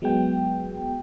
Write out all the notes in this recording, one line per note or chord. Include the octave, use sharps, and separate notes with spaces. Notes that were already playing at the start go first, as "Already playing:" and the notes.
F#3 G#3 B3 G5